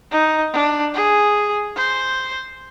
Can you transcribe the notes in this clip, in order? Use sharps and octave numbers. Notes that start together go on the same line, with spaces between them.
D#4
D4
G#4
C5